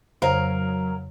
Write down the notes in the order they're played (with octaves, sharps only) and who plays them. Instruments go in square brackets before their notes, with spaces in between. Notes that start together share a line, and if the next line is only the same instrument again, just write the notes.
[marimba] F2 C#3 C5 [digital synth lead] F#3 [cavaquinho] A#4 F5